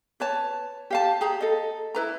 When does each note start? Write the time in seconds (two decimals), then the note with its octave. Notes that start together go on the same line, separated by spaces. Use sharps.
0.20 B4 C#5 A5
0.90 G4 F5 A5
1.21 G4 G#4 A#5
1.41 A4 D#5
1.95 E4 B4 A#5